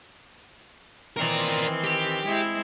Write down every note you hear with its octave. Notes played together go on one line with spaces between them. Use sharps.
D#3 E3 C4 A#4 D5
G4
G#3 C4 E4